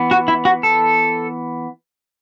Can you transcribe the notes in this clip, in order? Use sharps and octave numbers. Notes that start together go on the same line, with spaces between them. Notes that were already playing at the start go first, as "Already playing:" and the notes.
Already playing: E3 B3
F#4
E4
F#4
A4